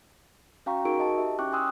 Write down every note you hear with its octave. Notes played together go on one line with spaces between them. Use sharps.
C#4 F#4 F5 G5 A#5 C#6
D#4 F#4 G#4 A#4 C#6 D7
D#5 A5
G4 E5
C#4 E4 G5 C#6 D6 F#6
G5 G#5 C6 D#6 E6 F#6